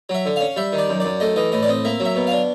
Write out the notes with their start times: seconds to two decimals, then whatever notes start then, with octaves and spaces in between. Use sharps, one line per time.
0.09 F#3
0.14 E5
0.26 D3
0.36 C#4 F5
0.56 G3 E5
0.73 D#3
0.78 D5
0.89 F#2
1.00 F#2 D5
1.20 A3 D#5
1.36 E3 D#5
1.52 A2 D#5
1.63 D5
1.68 C4 D#5
1.85 A#3 E5
2.00 F#3
2.05 E5
2.16 B2
2.27 D4 F5